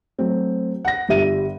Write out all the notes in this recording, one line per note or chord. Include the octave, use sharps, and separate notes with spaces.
F#3 A3 C4
F#5 A#6
G1 G3 E5 D#7